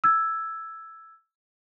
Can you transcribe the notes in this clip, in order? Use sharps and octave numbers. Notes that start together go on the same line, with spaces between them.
E6 G#6